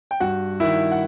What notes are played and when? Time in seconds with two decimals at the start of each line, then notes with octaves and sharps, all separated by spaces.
0.11 G5
0.20 G2 F#4 F#5
0.60 D#3 E4 E5
0.92 F#5